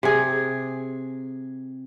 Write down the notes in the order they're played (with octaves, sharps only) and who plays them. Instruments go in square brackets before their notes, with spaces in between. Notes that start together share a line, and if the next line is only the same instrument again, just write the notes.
[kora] C3 G#4